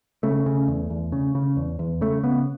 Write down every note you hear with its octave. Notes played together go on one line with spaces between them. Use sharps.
C#3 A3
C#3
E2
E2
C#3
C#3
E2
E2
C#3 A3
C#3 B3